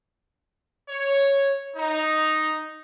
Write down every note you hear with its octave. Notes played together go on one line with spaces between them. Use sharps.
C#5
D#4